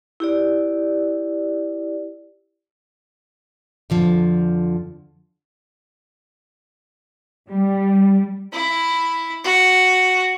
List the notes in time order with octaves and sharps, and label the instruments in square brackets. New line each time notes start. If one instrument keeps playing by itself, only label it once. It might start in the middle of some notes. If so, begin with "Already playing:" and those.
[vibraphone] E4 G4 D5
[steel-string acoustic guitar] F2 D3 F3
[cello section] G3
[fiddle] E4
F#4